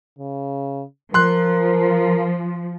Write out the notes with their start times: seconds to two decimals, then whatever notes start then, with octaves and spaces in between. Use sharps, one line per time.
0.19 C#3
1.14 F3 A#4 C6 F#6